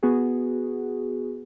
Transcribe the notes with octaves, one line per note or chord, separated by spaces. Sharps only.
B3 F#4 G#4